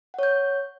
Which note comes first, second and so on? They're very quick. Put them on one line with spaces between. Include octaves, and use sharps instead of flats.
F#5 C#5 G6